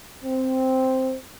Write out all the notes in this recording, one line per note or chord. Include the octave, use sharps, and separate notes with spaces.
C4